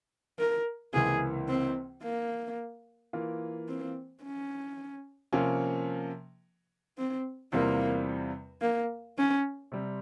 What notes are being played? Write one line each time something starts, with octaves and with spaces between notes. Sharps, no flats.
A#4
C#2 C3 E3 A#3 G#4
C4
A#3
E3 A#3 F4
C4
C#4
C3 F3 A#3 C#4
C4
E2 C3 G3 A#3 C4 F4
A#3
C#4
C3 G3 C4